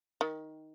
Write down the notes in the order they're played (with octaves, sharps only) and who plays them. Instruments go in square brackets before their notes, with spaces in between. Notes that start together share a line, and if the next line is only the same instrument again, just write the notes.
[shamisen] D#3